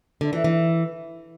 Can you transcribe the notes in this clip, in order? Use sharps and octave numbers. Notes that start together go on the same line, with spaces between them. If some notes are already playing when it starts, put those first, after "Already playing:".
D3
E3
E3